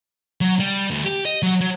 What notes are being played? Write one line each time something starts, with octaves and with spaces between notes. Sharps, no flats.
F#3
G3
D2
G4
D#5
F#3
F#3